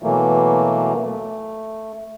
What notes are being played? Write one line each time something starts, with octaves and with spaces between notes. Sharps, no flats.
B2 E3 F#3 A3 A#3
A3